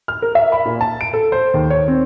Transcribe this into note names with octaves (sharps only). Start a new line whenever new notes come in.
F6
A#4
E5
B5
A#2
A5
D7
A4
C5
D#2
C#5
C4